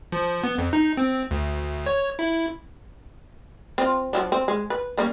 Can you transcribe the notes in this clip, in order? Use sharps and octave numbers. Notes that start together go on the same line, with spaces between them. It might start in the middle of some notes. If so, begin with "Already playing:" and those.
F3
B3
F2
D#4
C4
D2
C#5
E4
C4 F4
F3 F#3 D4
C4
G#3
B4
G3 A#3 C#4